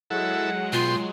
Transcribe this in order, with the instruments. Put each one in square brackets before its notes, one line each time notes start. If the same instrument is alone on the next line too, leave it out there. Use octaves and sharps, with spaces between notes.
[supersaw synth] F#3 G#3 [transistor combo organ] E4 A4 [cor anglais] F#5
[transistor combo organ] B2 G5 C6 [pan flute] F4